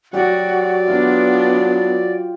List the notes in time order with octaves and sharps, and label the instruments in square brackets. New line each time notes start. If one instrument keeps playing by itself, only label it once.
[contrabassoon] F#3 [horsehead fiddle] F#4 [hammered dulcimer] G4 [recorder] D5
[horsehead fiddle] B3 D4 [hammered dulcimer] F4